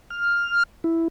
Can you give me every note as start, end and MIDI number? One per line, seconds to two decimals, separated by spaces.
0.10 0.63 89
0.84 1.08 64